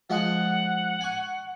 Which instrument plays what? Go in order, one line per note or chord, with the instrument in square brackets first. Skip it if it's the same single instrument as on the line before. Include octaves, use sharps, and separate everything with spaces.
[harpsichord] F3 G#3 D#5 [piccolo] F#5
[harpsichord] G#5 C#6